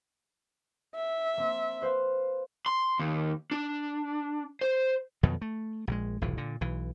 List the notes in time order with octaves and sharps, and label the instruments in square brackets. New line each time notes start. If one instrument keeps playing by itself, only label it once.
[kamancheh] E5
[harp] A#3 C4
B4 C5 F5
[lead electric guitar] C6
D#2
D4
C5
[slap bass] F2 B2 D#3 F#3
A3
A#1 D3 G#3
F1 B1 A2 E3
A#2 D3
B1 E3